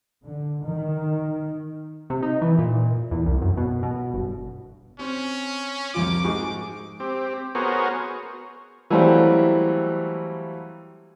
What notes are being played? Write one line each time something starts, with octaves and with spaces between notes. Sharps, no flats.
D3
D#3
C3
D#4
E3
A#2
E2
C2
F#2
B2
B2
G1
C4 C#4
C2 F2 F4 D6
G#2 G#4 C#6
C4 G4
B3 F#4 G#4 A#4 C5 C#5
E3 F#3 G3 A3 A#3 C4